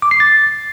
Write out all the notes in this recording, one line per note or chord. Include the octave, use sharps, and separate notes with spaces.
D6
C7
A6